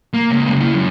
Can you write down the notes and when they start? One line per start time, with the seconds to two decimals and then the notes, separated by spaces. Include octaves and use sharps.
0.14 A#3
0.31 C#3 G#3
0.47 C#3 A#3
0.61 E4 F#5
0.74 F#2